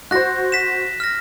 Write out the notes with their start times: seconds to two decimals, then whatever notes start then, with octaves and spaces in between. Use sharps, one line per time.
0.11 F#4 C5 F#6 A#6
0.52 B6 E7
1.00 F6 A#6